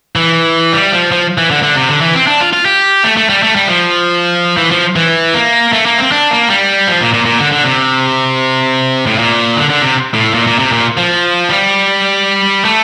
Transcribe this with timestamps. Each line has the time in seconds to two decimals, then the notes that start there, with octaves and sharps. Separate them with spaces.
0.16 E3
0.73 G3
0.92 F3
1.12 F3
1.38 E3
1.51 D3
1.63 D3
1.75 C3
1.89 D3
2.01 E3
2.14 C4
2.27 D4
2.41 F4
2.53 F4
2.66 G4
3.04 A3
3.17 A3
3.29 G3
3.43 A3
3.55 G3
3.68 F3
4.57 E3
4.71 F3
4.96 E3
5.34 A#3
5.73 A3
5.86 A#3
5.98 C4
6.12 D4
6.31 A#3
6.50 G3
6.87 F3
7.01 A#2
7.14 A#2
7.26 A#2
7.39 D3
7.52 D3
7.64 C3
9.07 A2
9.18 A#2
9.57 D3
9.70 D3
9.82 C3
10.14 A2
10.34 A#2
10.47 A#2
10.59 C3
10.72 A#2
10.97 F3
11.49 G3
12.65 A3